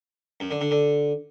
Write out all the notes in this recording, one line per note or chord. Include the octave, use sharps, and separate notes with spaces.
F#2
D3
D3
D3